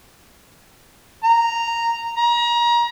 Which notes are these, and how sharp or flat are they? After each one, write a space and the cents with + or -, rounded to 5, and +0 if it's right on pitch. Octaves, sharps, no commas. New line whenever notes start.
A#5 -5
A#5 +30